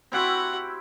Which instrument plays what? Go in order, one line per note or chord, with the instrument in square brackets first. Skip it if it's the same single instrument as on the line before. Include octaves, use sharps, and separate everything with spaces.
[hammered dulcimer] C4 E4 G4 [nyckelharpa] F#4 F#5